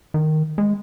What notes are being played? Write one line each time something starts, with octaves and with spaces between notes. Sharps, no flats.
D#3
G#3